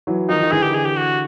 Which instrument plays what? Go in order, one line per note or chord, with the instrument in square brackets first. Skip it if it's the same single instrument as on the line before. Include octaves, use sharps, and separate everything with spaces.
[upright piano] E3 F#3
[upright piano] D#3 F3 [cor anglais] D#4
[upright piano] D#3
[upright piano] D3 E3 [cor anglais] G#4
[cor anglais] G4
G#4
G4
F#4